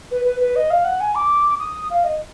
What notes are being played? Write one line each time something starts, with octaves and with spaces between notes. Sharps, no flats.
B4
B4
B4
D#5
F5
F#5
G#5
D6
D#6
F5
D#5